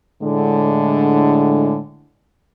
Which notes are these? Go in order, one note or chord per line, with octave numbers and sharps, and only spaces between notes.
A2 D3 G#3